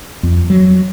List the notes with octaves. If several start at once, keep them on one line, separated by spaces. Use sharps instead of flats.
F2
F#3